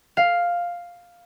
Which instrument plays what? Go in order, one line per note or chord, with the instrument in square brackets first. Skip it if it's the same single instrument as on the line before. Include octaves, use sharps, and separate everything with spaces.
[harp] F5